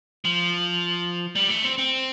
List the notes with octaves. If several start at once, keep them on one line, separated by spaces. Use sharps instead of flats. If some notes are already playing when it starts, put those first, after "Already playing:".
F3
G3
A3
C4
C4